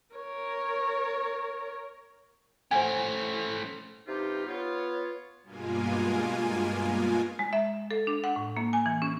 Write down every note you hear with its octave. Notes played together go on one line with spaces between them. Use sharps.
A#4 C#5
A3 C#4 C5 F#5 G#5
G2 C3 D#4 F4 G4
B3 F4 C#5
G2 B2 G#3 A#3 F4 G#5
G#3
E5
A4
D4
F#5
A2
A#3
G#5
E3
C#4